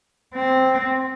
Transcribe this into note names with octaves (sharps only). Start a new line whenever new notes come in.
C4